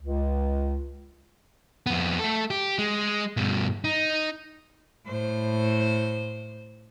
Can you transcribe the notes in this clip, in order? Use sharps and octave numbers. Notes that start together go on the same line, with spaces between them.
C#2
F2 B3
A3 A4
G4
G#3
G2 B2
D#4
A2 C5